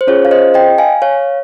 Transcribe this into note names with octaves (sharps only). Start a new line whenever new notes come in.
C5
C#4 F4 G#4 C#5
F5
C5 D#5
D#5 G5
F5 G#5
C#5 F5